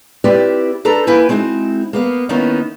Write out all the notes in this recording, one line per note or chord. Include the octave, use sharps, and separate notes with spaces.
C4 E4 F4 G4 B4 D5
D4 A4 B4 A#5
A#3 E4 B4 G5 G#5
G#3 C4 D#4 E4 F#4
A#3 B3 F5
D#3 A#3 B3 C#4 D#4 E4